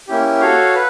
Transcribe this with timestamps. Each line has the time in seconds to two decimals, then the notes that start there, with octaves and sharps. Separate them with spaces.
0.08 A#3 C#4 E4 G4
0.41 F#4 A4 C#5 F5
0.75 B4